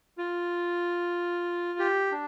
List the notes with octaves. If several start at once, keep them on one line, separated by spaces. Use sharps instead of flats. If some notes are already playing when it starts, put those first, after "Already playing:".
F4
G4
D4